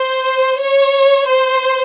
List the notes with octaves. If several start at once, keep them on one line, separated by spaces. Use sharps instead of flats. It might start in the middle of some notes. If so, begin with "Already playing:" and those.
Already playing: C5
C#5
C5